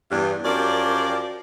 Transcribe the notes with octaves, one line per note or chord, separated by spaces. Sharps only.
E2 G2
F#2 F3 G4 A#4 D5